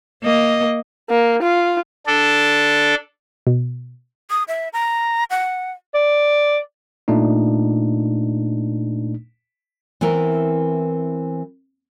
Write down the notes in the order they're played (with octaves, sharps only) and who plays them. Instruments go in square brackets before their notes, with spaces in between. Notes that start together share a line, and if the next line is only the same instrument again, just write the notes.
[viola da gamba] A#3 D#5
[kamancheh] A#3
F4
[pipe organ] D4 A4
[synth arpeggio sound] B2
[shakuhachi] D#6
E5
A#5
F#5
[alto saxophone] D5
[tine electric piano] A#2 A3 D4 D#4
[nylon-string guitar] E3 B3 C4 E4 A#4